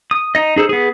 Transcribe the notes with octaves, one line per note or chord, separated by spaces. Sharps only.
D#6
D#4 D#5
D#4 G#4 A4 C5
B3 G#4